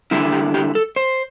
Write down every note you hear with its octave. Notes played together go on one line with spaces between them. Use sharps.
D3 G3 E4 G4
G4
G4
A4
C5